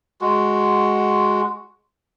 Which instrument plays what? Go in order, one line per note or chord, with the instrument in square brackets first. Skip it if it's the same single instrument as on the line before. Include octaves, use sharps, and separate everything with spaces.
[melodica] G#3 F#4